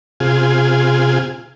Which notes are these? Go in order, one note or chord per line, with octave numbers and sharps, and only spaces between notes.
C3 F4 G#4